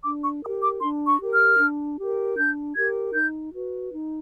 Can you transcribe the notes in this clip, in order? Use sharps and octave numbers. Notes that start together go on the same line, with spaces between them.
D4 D6
C#6
G4 A#4 D#6
D6
D4 C6
C#6
G4 A#4
F6
D4
G4 A#4
D4 G6
G4 A#4 G#6
D#4 G6
F#4 B4
D#4